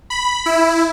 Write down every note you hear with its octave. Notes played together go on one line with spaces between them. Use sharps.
B5
E4